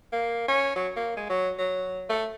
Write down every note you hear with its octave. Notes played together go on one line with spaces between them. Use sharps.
A#3
C#4
F#3
A#3
G#3
F#3
F#3
A3